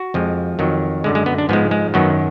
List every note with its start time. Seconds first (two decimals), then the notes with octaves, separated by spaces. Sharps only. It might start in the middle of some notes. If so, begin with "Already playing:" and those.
Already playing: F#4
0.14 F2 F3 G#3
0.59 F2 D#3 F#3
1.04 F#2 D3 G#3
1.15 G#3
1.26 B3
1.38 D4
1.49 G#2 F3 G#3 B3
1.71 G#3
1.94 F#2 D#3 F#3 B3